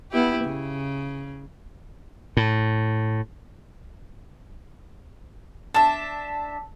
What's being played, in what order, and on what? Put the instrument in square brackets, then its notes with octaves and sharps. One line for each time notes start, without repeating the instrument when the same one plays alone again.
[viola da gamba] B3 E4 G4
C#3
[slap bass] A2
[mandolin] D4 E5 [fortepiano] A5